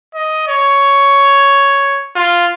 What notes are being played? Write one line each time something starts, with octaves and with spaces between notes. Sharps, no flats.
D#5
C#5
F4